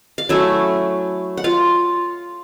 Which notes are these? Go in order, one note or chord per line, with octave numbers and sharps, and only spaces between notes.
F5
F#3 A3 C#4 E4 E5
F#5
F4 F5